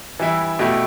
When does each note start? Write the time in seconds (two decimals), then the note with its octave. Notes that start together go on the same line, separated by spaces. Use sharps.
0.20 E3 G3 E4
0.59 B2 A3 E4 G4